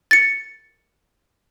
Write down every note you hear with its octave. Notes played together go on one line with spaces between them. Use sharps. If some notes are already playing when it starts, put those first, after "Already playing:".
A6 C#7